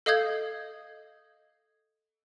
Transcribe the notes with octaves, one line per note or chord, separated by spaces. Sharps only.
A4 D#5 F5 D#6 G6 G#6